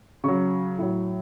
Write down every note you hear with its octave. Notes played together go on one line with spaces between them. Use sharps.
C#3 F#3 C#6
A2 F#3